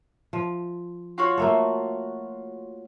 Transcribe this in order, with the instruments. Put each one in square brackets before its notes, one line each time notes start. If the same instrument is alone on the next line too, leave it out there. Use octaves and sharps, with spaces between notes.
[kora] F3
[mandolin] F4 F#4 C#5
[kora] A3 A#3 A4